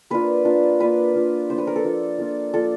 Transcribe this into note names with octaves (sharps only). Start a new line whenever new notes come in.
A#3 D4 F4 B4
A#3 D4 F4
A#3 D4 F4 B4
A#3 D4 F4
F3 A#3 D4 F4 C5
B4
A#4
A4
F3 A#3 D4 F4
F3 A#3 D4 F4
F3 A#3 D4 F4 A4